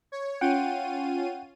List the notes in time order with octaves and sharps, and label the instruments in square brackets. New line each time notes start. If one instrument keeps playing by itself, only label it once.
[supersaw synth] C#5
[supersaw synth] C#4 F4 D#7 [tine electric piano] F#5 G5